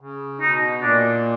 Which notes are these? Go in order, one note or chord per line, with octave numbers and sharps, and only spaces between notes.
C#3
B2 D#4
A#2 D4